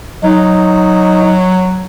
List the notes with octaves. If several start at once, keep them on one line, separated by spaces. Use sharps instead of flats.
F#3 D#4